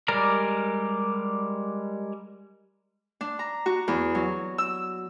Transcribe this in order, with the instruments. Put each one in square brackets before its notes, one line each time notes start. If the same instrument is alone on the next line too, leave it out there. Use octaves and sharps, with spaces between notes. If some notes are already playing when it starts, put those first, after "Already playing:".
[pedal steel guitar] G3 G#3 A#4 D5 A#5
[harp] D4
A#5
F#4
E2
F#3
E6